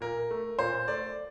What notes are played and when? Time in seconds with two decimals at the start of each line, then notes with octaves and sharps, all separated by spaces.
0.01 A#2 A#4
0.31 A3
0.59 A#2 C5
0.88 A3 D5